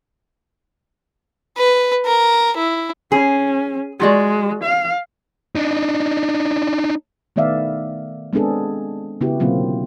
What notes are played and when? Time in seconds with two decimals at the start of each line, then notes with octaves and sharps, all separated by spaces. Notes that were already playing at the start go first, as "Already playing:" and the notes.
1.57 B4
2.06 A#4
2.57 E4
3.12 C#4 G#4
4.00 G#3 F4 F#4 D5
4.63 F5
5.55 D4 D#4
7.36 D#3 A3 B3 D5 E5 F5
8.33 G#3 B3 C4 D4 G#4 A4
9.21 C#3 B3 E4 F#4 G4
9.40 B2 D3 F#3 A#3 C4 F4